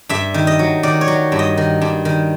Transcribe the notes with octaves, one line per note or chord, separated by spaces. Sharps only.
G2 E5
D#3
D#5
F#3
D#3 D5
C#5
F#3
G2
D#5
D#3
G2
D#3